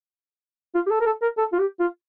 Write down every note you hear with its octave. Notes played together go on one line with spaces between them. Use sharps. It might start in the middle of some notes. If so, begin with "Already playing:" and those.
F4
G4
A4
A#4
A4
A#4
A4
F4
G4
F4